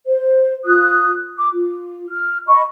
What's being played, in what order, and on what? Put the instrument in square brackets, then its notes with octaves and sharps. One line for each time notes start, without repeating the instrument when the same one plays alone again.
[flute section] C5
F4 D#6 F#6
D6
F4
F6
D#5 B5 C#6